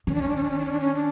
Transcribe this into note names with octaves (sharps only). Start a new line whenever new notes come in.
D#3 C#4
D4
C#4
D4
C#4
D4
C#4
D4
C#4
D4
C#4
D4